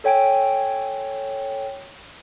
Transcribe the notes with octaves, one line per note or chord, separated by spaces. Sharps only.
A4 C#5 G5 G#5 D7